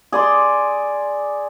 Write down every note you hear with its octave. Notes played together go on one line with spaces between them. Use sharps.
G#4 D5 C6